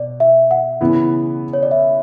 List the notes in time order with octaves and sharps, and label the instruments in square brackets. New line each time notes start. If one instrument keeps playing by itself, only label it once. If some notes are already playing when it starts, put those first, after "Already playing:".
Already playing: [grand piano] B2 [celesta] D5
[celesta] E5
F#5
[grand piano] C#3 E3 B3 E4
[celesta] C#5
D5
E5